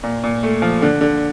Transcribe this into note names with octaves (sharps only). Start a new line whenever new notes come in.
A#2
A#2
A3
F3
D3
D3